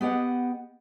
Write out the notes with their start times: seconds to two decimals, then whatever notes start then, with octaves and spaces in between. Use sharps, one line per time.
0.01 B3 G4 D#5 F#5